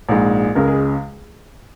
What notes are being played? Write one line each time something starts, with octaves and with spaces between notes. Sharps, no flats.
A#1 G#2 G#3
C#2 C#3 G#3 A#4
G#4